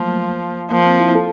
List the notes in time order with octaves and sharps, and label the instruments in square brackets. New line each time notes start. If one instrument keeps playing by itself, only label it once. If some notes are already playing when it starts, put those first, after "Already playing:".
Already playing: [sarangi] F3 [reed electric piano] F#3 A3 A#3
[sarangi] F3 [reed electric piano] A#3
[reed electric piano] C4
E4
A4